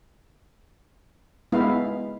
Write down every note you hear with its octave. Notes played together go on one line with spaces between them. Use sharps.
G#3 B3 E4 F5